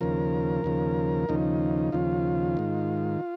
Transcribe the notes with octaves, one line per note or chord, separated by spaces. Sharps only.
D#2 C#3 F3 A#4
D#2 C#3 F3
D#2 C#3 F3 D#4
D#2 C#3 F3 F4
G#2 D#3